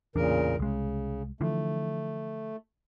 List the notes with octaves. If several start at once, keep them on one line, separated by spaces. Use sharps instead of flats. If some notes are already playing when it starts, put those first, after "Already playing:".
A1 E2 A#2 C#3 D4 A#4
C2 C#3 G#3
D3 E3 F3 A3